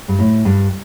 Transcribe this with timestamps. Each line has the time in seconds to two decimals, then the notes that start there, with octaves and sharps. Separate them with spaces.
0.08 G2
0.19 A2
0.45 G2